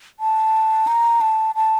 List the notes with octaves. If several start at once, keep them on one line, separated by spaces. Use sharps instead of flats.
A5
A#5
A5
A5